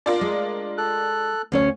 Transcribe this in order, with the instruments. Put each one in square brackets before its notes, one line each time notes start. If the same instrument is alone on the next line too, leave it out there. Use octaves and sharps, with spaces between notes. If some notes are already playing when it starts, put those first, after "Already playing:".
[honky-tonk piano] D4 F4 A#4
[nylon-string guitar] G#3
[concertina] A4 F#6
[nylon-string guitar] D2 C#4 C#5